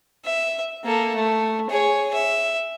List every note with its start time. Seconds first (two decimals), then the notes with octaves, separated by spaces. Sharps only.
0.25 E5
0.84 A#3 A4
1.15 A3
1.70 G#4 C#5
2.13 E5